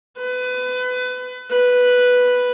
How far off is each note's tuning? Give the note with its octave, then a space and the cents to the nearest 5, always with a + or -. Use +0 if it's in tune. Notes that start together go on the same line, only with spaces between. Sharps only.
B4 +25
B4 +0